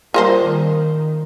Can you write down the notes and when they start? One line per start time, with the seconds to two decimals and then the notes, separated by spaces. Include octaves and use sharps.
0.14 G3 A#3 F4 A#4 C5
0.45 D#3